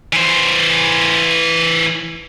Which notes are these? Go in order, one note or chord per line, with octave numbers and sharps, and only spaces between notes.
E3 C5